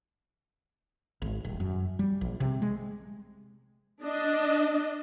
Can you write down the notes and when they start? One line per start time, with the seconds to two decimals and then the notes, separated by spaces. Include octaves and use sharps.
1.22 G#1
1.45 D#1
1.60 F#2
1.99 G3
2.21 A#1
2.40 C3
2.62 G#3
4.03 D4 D#5